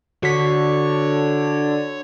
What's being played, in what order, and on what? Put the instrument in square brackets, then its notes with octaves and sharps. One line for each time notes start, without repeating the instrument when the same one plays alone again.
[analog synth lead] D3 [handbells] F#4 B6 [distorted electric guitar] C#5